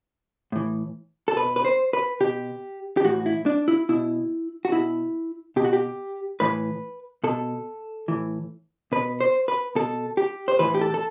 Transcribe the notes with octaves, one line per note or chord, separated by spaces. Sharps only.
A2 E3
A4
B2 B4
B4
C5
B4
B2 G4
G4
A2 E3 F#4
E4
D4
E4
B2 E4
F#4
B2 E4
B2 G4
F#4
G4
A2 E3 B4
B2 A4
A2 E3
B2 B4
C5
B4
B2 A4
G4
C5
A2 E3 B4
G4
A4
A4